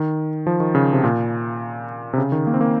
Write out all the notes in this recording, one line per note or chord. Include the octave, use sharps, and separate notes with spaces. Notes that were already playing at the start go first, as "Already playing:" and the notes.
Already playing: D#3
F3
D#3
C#3
C3
A#2
C3
C#3
D#3
A#3
C4
A#3